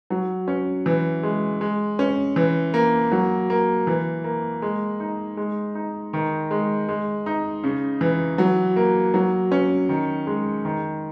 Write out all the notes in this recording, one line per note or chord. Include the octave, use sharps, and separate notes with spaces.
F#3
C#4
E3
G#3
G#3
C#4
E3
A#3
F#3
A#3
E3
A#3
G#3
D#4
G#3
D#4
D#3
G#3
G#3
D#4
C#3
E3
F#3
A#3
F#3
C#4
D#3
G#3
D#3